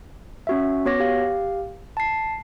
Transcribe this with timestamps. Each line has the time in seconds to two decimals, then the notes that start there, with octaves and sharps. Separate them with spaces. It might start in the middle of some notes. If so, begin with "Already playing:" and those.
0.47 C#4 F#4 E5
0.85 B3 F#4 C#5 D6 A#6
1.00 G4 F5
1.97 A5 C7